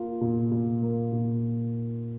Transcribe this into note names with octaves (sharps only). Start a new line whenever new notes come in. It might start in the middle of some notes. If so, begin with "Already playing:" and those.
Already playing: A#3 F4
A#2
A#2
A#3
A#2